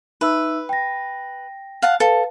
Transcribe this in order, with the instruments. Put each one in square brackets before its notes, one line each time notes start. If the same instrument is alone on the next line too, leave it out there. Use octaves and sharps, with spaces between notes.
[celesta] D#4 E5 E6 [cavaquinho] B4
[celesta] G5 A#6
[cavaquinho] F5 F#5 A5
[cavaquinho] A4 [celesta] B4 F5 A5